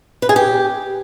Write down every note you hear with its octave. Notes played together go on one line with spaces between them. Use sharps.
B4
G#4
G4